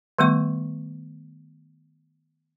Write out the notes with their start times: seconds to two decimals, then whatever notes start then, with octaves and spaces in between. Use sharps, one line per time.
0.18 D#3 G3 A3 B3 C#6